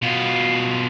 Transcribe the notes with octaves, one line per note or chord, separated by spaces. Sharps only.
B2 F4